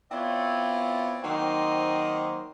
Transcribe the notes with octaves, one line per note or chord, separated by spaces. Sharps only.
B3 C4 E4 F4 C#5 D5
D#3 F#3 A#3 C4 C5 D#5